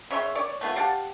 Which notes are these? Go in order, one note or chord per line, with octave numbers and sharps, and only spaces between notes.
C#3 C#5 E5 C6
C#5 D5
A3 B3 F4
G4 F5 F#5 A5